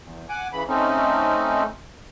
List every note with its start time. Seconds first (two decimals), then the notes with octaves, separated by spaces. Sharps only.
0.01 E2
0.29 F#5 G#5 D6
0.53 C#3 E3 B5
0.68 A3 C4 C#4 D#4